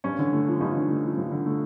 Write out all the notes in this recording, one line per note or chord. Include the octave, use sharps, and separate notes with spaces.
G2 C#4
D3
A3
F3
G2 C#4 D#4
D3
A3
F3
G2
D3
A3